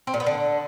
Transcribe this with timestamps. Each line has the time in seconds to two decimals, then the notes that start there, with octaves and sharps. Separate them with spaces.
0.07 C4
0.14 A#2
0.20 B3
0.26 D3